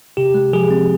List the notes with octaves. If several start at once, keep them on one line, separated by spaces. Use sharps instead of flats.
C3 G4
G#3
F3 G#4
C4